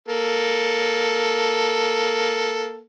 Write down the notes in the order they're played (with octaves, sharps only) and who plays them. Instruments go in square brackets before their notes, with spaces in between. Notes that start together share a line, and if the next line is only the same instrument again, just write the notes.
[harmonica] A#3 A4